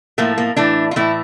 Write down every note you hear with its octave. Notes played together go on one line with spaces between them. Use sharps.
A2 F3 A3 A#3
A#3
A2 E3 A3 D4
F4
A2 E3 A3 E4